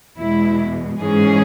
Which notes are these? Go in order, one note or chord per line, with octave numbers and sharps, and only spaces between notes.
E2 B2 G#3 E4
G#2 E3 G#3 C#4 G#4